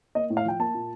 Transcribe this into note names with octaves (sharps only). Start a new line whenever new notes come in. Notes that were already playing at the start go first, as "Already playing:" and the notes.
A#3 D#5
A2
F5
F3 G5
A#3 A5
A#2